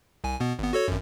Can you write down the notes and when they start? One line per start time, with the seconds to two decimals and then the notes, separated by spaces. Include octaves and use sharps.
0.24 C2 G#5
0.40 B2 B3
0.59 G#1 B3
0.73 F#4 A4 C#5
0.88 G#1 F#2